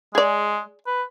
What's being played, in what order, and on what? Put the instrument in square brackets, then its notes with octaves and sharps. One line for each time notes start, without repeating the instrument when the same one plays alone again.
[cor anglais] G#3 [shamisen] G#4 D5
[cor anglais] B4